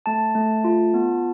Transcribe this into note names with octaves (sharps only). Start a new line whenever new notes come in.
A3 A5
A3
F4
B3